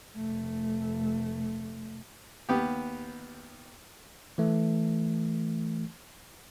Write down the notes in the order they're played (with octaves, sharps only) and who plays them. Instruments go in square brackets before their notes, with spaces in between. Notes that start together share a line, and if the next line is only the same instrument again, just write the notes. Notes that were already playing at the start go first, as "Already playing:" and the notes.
[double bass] F1 A3
[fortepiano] D#2 B3 G4
[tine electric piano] E3 A3